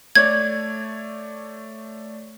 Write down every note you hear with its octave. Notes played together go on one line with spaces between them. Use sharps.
A3 C#5 D5 G#6